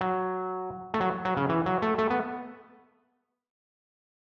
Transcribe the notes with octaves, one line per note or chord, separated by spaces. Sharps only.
F#3
A3
F#3
F#3
C#3
E3
F#3
A3
A3
B3